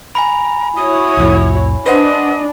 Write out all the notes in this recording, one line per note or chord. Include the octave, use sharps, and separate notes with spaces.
G#5 A#5 B5
E4 F#4 C#5 D#6
C2 F2 A2
D4 B4 C5 D#5 F#5